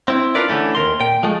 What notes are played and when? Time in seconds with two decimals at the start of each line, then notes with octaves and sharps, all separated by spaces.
0.08 C4 E4
0.35 D4 F4 A#4 B4 D5
0.49 D3 E3 A3 C#4
0.75 D#2 B2 A#4 C6
1.00 A#2 G5
1.23 F3 G#3 A3